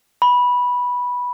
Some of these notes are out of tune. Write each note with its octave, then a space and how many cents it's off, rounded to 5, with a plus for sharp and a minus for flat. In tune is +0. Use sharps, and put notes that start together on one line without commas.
B5 -10